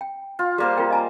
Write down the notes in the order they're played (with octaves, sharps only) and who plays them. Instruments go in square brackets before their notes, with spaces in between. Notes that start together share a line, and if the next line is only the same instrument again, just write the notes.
[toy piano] G5
[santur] F4
[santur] G3 A#3 C5 [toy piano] G#4
[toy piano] F4 A#4 G5
D#5 G#5 A#5